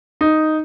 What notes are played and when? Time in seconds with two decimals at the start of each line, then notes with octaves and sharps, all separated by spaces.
0.21 D#4